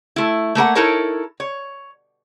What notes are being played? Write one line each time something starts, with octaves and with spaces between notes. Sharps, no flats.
A3 E4
A3 A#3 A#4 F#5
D#4 E4 A4 A#4 C#5
C#5